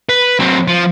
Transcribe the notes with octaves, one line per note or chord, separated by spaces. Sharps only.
B4
F#3 C4
F3